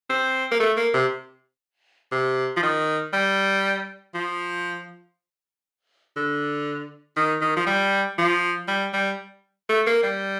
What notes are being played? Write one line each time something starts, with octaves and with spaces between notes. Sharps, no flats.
C4
A#3
A3
A#3
C3
C3
F3
D#3
G3
F3
D3
D#3
D#3
F3
G3
F3
G3
G3
A3
A#3
G3